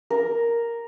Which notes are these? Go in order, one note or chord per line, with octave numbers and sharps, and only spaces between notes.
A#4